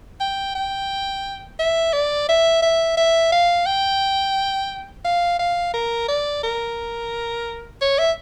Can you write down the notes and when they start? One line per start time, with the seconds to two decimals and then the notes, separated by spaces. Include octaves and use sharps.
0.20 G5
0.55 G5
1.59 E5
1.93 D5
2.28 E5
2.62 E5
2.97 E5
3.32 F5
3.66 G5
5.05 F5
5.39 F5
5.74 A#4
6.08 D5
6.43 A#4
7.81 C#5
7.98 E5